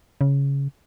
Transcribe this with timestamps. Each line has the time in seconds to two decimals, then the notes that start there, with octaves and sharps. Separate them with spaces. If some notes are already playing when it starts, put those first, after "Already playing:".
0.21 C#3